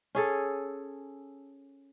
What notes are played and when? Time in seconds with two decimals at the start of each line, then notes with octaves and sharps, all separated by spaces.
0.15 C#4 G#4 A4